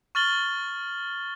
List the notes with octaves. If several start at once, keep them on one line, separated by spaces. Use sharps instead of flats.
C#6 F6 A6 F#7 G7